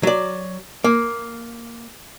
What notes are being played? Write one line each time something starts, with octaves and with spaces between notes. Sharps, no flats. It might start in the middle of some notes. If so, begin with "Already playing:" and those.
F#3 D5
A#3